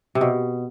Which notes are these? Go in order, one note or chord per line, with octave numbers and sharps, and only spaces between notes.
C3
B2